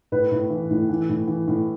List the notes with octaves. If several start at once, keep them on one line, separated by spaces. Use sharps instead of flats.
A2 B4
A2
E3
A2
E3
A2
E3
A2